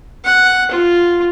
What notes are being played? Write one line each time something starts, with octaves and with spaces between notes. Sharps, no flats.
F#5
F4